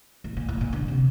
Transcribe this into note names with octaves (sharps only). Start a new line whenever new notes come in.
A2
A#2
A2
A#2
D3
C3